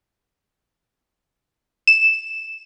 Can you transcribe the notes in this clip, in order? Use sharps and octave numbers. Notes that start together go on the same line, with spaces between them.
E7